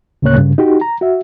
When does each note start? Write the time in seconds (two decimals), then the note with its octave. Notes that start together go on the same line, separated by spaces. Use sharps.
0.22 D2 A2 C#3 A#3 C#5 F#6
0.36 G2 C#3
0.58 D#4 F#4 G4
0.81 A#5
1.01 F#4 E5